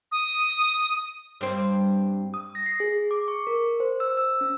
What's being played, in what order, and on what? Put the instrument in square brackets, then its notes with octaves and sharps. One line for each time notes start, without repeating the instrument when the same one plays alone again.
[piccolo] D#6
[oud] G2 C4
[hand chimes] D#6
A#6
C7
G#4
D6
C#6
A#4
C5
E6
E6
C#4